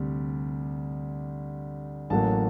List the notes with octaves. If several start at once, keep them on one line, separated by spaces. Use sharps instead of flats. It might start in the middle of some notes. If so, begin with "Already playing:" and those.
Already playing: D2 C3 G3
A1 A2 F#3 A#3 A5